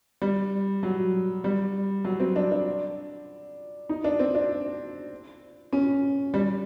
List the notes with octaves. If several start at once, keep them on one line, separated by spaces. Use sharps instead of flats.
G3
F#3
G3
F#3
C4
D4
D4
D#4
D4
C4
D4
C#4
G3